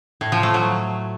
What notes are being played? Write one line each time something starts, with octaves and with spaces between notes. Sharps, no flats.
A2
F3
A3
F#3